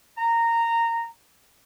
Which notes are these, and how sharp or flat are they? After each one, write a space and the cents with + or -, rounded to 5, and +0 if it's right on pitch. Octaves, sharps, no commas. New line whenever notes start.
A#5 -15